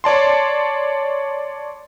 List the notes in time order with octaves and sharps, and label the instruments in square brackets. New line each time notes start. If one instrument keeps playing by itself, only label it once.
[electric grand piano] C#5 D5 A5 C6